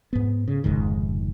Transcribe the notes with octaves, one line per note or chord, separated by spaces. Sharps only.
G#2 B3
C#3
F1 C#2 G#2 D#3